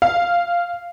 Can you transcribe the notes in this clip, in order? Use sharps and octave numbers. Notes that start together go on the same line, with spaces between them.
F5